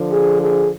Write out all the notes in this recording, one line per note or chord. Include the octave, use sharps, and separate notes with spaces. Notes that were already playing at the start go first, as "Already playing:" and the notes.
Already playing: D3 F3
G#4
G#4